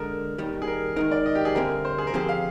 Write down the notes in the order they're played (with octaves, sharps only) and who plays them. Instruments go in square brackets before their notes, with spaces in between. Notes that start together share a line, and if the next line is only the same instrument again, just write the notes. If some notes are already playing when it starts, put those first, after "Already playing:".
Already playing: [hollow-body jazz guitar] D3 G#3 D4 [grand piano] A#4
[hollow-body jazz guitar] D#2 D#3 G3
[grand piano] G#4
A#4
[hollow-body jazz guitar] D#3 G#3 D#4 [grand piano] A#4
[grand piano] D5
D#5
G4
G#4
[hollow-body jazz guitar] D2 D3 G3 C4 [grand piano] A#4
[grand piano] C5
G#4
A#4
[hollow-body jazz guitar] D3 F3 C4 G4 C5 [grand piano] G#4
[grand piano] F5